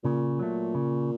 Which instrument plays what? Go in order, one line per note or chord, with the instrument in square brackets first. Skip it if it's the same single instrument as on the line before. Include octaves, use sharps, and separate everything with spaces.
[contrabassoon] A#2 [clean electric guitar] C#3
[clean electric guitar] F#3 A3
C#3